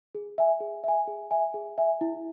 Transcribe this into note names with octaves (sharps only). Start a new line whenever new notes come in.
G#4
E5 G#5
G#4
E5 G#5
G#4
E5 G#5
G#4
E5 G#5
E4